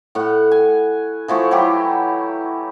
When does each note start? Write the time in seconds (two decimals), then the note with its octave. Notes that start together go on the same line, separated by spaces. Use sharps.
0.15 A2 F#5
0.51 G#5
1.28 E3 F3 A3 F#4
1.51 E3 F#3 E4 G4